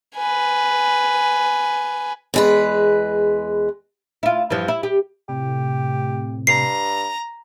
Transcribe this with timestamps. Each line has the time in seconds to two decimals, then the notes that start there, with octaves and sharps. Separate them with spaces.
0.16 B4 G#5
2.34 E2 G#3 B4
4.23 E4 F4
4.50 G2 E3 F3
4.68 E4
4.83 G4
5.29 A2 C3 G4
6.47 G2 A#5 C7